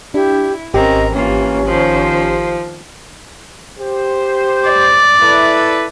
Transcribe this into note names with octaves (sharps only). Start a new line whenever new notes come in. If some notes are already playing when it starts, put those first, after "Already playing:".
D4 E4 G4
G#1 C4 C#4 G4 A#4 D#5
E3 A#3 C#4 F4
D#3 F3 C5
G4 C5
D5
E4 A4 B4